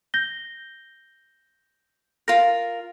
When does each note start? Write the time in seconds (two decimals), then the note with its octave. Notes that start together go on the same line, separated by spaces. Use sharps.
0.14 G6 A#6 G7
2.28 F4 A#4 A#6